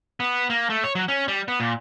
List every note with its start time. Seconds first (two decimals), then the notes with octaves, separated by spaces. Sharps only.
0.20 B3
0.50 A#3
0.70 A3
0.84 C#5
0.95 F#3
1.08 C#4
1.28 G3
1.48 B3
1.60 A#2